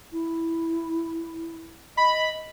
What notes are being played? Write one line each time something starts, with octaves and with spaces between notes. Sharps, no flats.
E4
D#5 B5